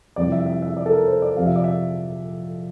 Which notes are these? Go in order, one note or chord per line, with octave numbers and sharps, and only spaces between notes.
F2 C3 E3 G3 C4 D5
E5
E5
E5
D5
A4
A#4
C5
D5
F2 C3 F3 C4 F5
E5
D5
E5